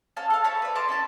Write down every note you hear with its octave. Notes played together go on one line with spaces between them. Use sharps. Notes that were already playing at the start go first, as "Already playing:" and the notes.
C#4 F5 A5
A4 F5
C#5 F5 A5 B5
B4 D5
A5 A#5 C6 D6
C#4 E4 A5